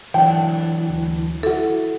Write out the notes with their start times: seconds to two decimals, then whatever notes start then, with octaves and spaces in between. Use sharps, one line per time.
0.14 E3 F#3 D4 F#5 G5 A5
0.90 D2
1.43 E4 F#4 A4